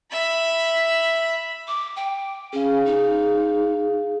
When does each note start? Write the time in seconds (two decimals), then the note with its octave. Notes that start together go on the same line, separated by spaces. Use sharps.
0.12 E5 B5
1.68 D6
1.96 G5
2.53 C#4 G#4 F5
2.86 D#4